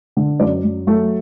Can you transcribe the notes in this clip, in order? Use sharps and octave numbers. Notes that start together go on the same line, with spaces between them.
D3
F#2 D5
F#2
F#3 A3